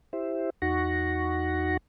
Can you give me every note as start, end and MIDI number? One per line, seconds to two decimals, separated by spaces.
0.13 0.50 64
0.13 0.50 67
0.13 0.50 72
0.13 0.50 76
0.62 1.77 40
0.62 1.77 63
0.62 1.77 66
0.62 1.77 78
0.62 1.77 85
0.62 1.77 94